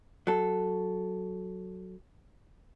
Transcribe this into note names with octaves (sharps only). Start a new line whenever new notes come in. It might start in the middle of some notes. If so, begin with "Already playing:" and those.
F#3 A4